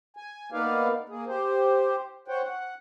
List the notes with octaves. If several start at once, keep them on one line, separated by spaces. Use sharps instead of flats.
G#5
A#3 B3 D#4 B4 D5 F5
A#3 G#4
G4 C5
C5 C#5 F#5 G5
F#5